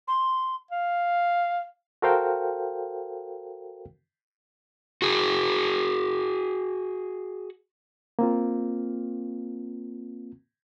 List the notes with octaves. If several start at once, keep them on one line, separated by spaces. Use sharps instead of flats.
C6
F5
F#4 A4 A#4 C5 F5 G5
F#4 G#4
A#3 C4 F4